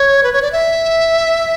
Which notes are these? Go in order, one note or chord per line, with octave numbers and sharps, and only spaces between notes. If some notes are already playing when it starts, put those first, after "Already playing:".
Already playing: C#5
B4
C#5
D5
E5